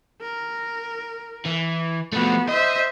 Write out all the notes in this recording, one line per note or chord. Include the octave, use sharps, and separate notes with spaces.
A#4
E3
F3 A3 B3 F#4
C5 D#5 E5